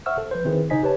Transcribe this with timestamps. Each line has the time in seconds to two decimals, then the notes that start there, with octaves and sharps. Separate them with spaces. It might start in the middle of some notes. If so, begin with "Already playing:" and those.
0.06 C5 E5 F#5 C#6 E6 F6
0.18 A4
0.31 F3 B4 C5
0.45 D#3 C4 E4 G#4 B4
0.70 C#3 D#4 C5 D#5 G#5 B6
0.83 G4 B4 C#5 A5